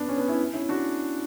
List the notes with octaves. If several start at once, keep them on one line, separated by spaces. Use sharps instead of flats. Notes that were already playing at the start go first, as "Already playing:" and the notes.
Already playing: B3 D4
C#4
B3 D4
C#4 E4
C#4 E4
D4 F#4